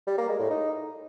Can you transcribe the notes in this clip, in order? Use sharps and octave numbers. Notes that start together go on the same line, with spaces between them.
G3
A#3
G#3
A2
D#4